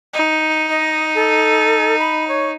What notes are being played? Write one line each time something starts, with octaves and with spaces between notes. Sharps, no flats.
D#4
D#5
A4
B5
C#5